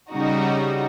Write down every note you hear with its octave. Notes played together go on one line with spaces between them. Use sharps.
C#3 G3 D#4 F#4